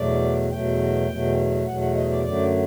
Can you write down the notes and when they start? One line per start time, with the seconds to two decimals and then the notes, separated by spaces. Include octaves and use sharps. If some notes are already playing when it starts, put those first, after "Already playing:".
Already playing: E2 B2 F#3 A3 D5
0.51 E2 B2 F#3 A3 G5
1.09 E2 B2 F#3 A3
1.66 E2 B2 F#3 A3 F#5
1.81 F#5
1.95 D#5
2.10 D5
2.24 F#2 D3 F#3 A3 D5